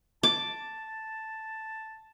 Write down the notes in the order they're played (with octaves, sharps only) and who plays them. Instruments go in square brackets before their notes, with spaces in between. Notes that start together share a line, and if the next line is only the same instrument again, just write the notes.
[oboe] A5 [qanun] D6